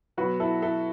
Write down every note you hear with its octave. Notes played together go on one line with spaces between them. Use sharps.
B2 F#3 F#4 B4
E4 A4
E4 A4